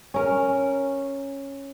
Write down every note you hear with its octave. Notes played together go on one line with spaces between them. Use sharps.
C#4 A#4